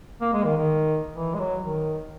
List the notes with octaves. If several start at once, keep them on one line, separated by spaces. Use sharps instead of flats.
A#3
G#3
D#3
D#3
E3
G#3
F#3
D#3